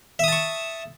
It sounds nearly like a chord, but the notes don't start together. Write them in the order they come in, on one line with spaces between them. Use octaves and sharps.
E5 D#6 A5 C#6